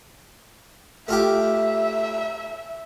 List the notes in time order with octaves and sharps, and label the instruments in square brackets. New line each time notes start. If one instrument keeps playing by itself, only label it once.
[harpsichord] A3 F4 G4 [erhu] E5